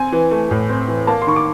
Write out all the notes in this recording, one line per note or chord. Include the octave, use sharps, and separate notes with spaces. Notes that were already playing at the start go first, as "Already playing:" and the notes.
Already playing: C4 G#5
E3
A3
A2
C4
E3
A#3 A5
C6
D#3 C#6
D6